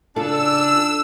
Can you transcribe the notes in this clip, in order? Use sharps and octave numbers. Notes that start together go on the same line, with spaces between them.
C#3 D4 F4 A4 E6